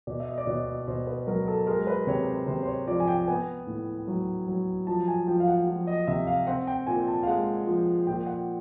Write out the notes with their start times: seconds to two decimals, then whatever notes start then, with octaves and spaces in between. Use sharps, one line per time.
0.07 B2 D5
0.20 E5
0.29 D#5
0.38 D5
0.47 B2 C#5
0.88 B2 C5
1.07 B4
1.27 F#3 A#4
1.48 A4
1.67 G#3 A#4
1.87 B4
2.07 C3 C#5
2.27 C5
2.47 C3 C5
2.63 C5
2.67 C#5
2.87 F3 D5
3.00 G#5
3.08 G5
3.28 B3 G#5
3.67 A2
4.08 F#3
4.48 F#3
4.87 F3 A5
5.08 G#5
5.27 F3 G5
5.40 F5
5.48 F#5
5.67 F3
5.87 D#5
6.07 C3 E5
6.27 F5
6.47 C4 F#5
6.67 G5
6.87 A#2 G#5
7.07 A5
7.23 F5
7.27 G#3 F#5
7.67 F3
8.07 A#2 G5
8.27 F#5